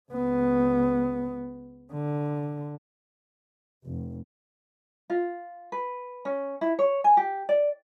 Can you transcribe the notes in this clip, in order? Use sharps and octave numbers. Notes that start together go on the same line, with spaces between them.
C#2 B3
D3
F1
F4
B4
C#4
E4
C#5
G#5
G4
D5